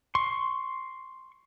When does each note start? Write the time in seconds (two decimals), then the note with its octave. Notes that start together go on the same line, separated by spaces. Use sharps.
0.15 C6 C#6